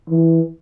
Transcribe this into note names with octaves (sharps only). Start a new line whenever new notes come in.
E3